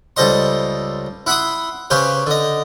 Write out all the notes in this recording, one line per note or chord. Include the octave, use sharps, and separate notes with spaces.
C#2 G3 A4 C5 D#5 C6
E4 F#5 B5 C6 D#6
C#3 C#4 G4 B4 C5
D3 D#5